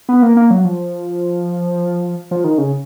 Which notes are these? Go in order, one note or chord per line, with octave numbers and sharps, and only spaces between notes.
B3
A#3
A#3
F#3
F3
F3
D#3
C#3